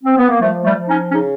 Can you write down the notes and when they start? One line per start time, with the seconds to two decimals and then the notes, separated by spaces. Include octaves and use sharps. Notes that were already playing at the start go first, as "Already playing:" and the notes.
0.03 C4
0.16 B3
0.28 A#3
0.40 F3 G3 A3
0.64 G3 A3
0.76 F3
0.88 C#4 D#4
1.11 C#3 C#4 D#4